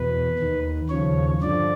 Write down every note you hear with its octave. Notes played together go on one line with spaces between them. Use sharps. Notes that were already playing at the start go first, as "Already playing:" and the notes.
Already playing: E2 B2 B4
D#2 D#3
D#2 C#3 F3 C#5
G2 D3 F3 D5